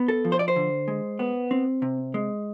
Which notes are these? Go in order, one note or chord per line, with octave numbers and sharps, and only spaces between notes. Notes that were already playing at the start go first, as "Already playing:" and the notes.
Already playing: B3
A4
F3
C5
D5
C5
D3
G#3
B3
C4
C3
G#3